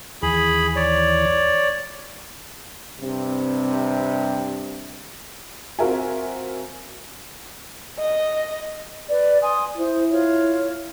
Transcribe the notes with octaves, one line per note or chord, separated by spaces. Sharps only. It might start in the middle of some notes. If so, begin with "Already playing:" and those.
D#2 E3 G#4 B5
C#5 D5
G2 C3
C4 F4 F#4 A#4 E5 G#5
D#5
B4 D5
G#5 C6 D#6
E4 C5
F4 C#5